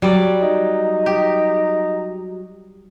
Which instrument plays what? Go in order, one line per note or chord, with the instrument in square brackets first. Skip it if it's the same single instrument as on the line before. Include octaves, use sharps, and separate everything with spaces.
[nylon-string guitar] F#3 [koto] G3 D5
[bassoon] D#4
[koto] G4